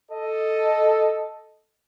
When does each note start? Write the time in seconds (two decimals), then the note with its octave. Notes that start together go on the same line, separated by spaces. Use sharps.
0.11 A4 D#5